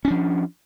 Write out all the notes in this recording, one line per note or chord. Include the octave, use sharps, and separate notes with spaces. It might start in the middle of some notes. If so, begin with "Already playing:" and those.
F3 C#4 D4